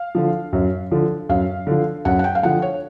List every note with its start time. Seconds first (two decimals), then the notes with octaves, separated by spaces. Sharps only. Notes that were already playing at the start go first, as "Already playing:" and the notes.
Already playing: F5
0.15 D3 F3
0.53 F#2
0.91 D3 F3
1.29 F#2 F5
1.67 D3 F3
2.05 F#2 F#5
2.19 F#5
2.24 G5
2.35 F5
2.43 D3 F3 F#5
2.62 C#5